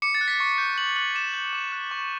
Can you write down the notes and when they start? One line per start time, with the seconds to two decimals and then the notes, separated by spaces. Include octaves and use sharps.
0.02 D6 C#7
0.15 A6
0.21 F#6
0.28 B6
0.40 C#6
0.58 G6
0.77 C#6 F#7
0.96 F#6 F#7
1.15 D6 E7
1.34 G6
1.53 D6
1.72 F#6
1.91 C#6